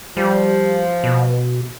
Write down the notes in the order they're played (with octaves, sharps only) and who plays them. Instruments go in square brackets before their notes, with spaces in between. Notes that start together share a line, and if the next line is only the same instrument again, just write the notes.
[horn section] F3 [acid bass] G3
[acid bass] B2